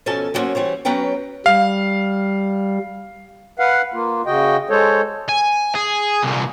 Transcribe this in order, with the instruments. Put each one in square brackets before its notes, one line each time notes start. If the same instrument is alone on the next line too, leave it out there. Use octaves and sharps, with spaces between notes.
[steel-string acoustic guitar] B2 F3 C#4 A4 G#5 A5
F#3 G3 A#3 C4 C#4 F#4
E3 G3 C5 C#5
F#3 B3 C#4 B4 G5 A#5
[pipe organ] G3 [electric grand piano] F5
[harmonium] B4 F5 F#5
A#3 F4
C#3 F#4 D#5 G5
G#3 A4 C5 C#5
[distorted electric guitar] G#5
G#4
C2 A#2